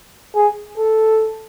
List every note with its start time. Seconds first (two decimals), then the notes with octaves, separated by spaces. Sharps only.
0.35 G#4
0.78 A4